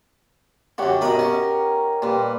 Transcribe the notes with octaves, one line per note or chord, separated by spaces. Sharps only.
F#2 D3 G4 C#5 F#5
B1 F#2 A#4 B4 D#5
C#4
A#2 G3 B4